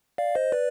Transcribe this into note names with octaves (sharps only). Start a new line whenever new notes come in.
D5 F5
C5 D#5
B4 D5